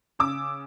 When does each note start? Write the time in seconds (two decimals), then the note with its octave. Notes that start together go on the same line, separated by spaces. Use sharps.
0.19 C#3 D6 E6